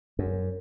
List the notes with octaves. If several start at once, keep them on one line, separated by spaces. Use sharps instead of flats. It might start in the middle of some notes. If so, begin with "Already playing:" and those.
F#2